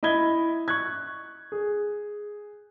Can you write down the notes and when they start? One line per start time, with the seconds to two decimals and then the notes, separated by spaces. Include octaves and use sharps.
0.03 E4 D#5 B5 G#6 G7
0.68 C#6 F#6 G#6
1.52 G#4